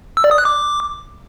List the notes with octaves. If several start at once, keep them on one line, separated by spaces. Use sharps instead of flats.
E6
D5
D#6
F#6
D6